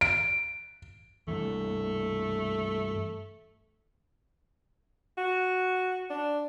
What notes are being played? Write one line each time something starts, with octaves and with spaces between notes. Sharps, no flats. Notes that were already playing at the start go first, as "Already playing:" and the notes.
D7
G2 E3 A3
F#4
D4